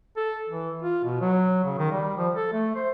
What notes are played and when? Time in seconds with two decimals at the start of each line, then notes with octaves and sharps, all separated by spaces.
0.17 A4
0.49 E3
0.82 F4
1.05 B2
1.21 F#3
1.64 C#3
1.78 D#3
1.92 G3
2.18 F3
2.35 A4
2.53 A3
2.75 C5